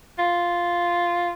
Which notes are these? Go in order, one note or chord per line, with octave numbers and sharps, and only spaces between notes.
F4